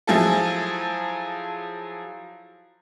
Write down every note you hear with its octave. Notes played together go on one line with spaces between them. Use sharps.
F3 F#3 E4 G#4 A4